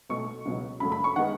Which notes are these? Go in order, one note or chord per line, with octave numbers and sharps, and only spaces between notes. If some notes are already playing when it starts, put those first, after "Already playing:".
B1 B2 A3 C#6
C#2 B2 F#3
F#2 C#3 F#3 A3 B5
B5
C#6
D#3 G#3 B3 F#5